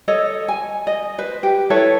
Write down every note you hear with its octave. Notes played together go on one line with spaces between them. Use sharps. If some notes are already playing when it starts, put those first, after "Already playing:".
A4 C#5 D#5
G#5
D#5
B4 C5
G4
E4 A4 B4 C#5